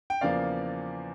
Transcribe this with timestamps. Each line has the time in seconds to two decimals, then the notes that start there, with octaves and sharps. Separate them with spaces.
0.10 G5
0.21 E2 C#3 F3 A#3 D5 F5